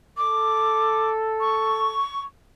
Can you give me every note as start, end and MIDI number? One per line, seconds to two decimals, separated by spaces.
0.17 2.02 69
0.17 1.10 86
1.40 2.21 85